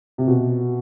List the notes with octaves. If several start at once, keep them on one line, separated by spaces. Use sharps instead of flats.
C3
B2